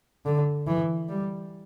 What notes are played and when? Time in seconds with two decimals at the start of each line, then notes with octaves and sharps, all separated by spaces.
0.25 D3
0.67 E3
1.09 G3